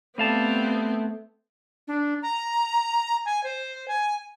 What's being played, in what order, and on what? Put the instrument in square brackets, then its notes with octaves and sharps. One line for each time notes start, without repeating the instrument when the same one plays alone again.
[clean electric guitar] G3 F5 A5 [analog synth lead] A3 [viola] B3 C4
[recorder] D4
A#5
G#5
C5
G#5